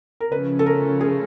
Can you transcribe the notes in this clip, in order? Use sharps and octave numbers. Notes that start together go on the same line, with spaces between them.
A#4
C#3 F3 A3 C#4 B4
A4
A#4
G#4